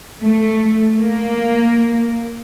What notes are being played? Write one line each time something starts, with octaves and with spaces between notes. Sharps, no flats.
A3
A#3